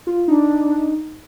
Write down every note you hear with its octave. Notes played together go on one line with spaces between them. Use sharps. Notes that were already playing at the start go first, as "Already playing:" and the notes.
F4
D4 D#4